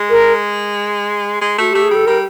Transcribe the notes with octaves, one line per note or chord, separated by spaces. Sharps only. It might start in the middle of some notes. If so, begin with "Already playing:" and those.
Already playing: G#3
A#4
G#3
A3 F#4
A3 G4
G#4
G3 A4
G3 A#4